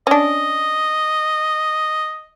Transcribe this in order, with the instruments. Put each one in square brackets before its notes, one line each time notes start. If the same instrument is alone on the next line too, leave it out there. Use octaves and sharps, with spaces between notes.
[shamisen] C#4 D4 [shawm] D#5